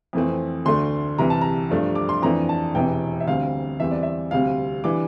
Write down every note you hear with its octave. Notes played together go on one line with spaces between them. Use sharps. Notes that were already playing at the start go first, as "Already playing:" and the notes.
F2 E3 A3 C4
D2 D3 A3 D4 C6
C2 C3 E3 A#5
A5
A#5
G2 F3 A3 D4
D6
C6
F2 E3 A3 D4 A#5
A5
E1 E2 C3 E3 G5
E5
D2 D3 G3 C4 F5
E2 E3 G3 C4 E5
D5
E5
D2 C3 G3 C4 F5
E3 G3 D4 D6